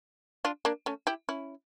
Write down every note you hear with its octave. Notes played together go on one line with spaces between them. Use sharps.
D4 F4
A#3 D4
A3 C#4
E4 G4
C#4 E4